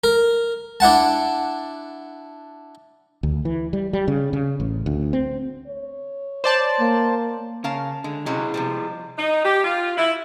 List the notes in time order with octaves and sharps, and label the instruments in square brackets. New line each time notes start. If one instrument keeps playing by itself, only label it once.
[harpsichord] A#4
D4 E4 F#5 A5
[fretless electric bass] D2
E3
G3
G3
C#3
C#3
A1
D2
C4
[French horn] C#5
[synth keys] C5 D5 A5
[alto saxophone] A#3
[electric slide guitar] C#3 C#4 [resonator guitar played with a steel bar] A#4 F5 A5
[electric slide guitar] D3 [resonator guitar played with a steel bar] G#3
[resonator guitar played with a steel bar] C3 F#3 C#4 [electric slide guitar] E4 G#4 D#5
[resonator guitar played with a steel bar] C3 F3 G3
[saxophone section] D#4
G4
F4
E4